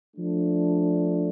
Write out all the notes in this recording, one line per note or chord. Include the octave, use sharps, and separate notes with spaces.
F3 A3 D4